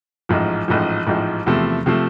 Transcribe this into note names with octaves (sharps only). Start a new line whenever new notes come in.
A1 G#2 F3
A1 G#2 F3
A1 G#2 F3
E2 C3 F3 A3
C3 F3 A3